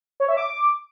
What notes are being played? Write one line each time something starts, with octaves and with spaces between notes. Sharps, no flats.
C#5
E5
D6